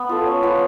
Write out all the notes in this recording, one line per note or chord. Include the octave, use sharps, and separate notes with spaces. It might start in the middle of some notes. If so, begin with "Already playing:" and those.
Already playing: B3
F4 A4
C#4
F4 B4